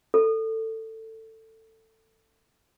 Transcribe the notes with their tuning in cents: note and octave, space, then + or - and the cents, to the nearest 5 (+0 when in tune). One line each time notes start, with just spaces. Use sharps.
A4 +20